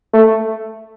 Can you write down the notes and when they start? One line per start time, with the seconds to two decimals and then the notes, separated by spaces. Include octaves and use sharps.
0.14 A3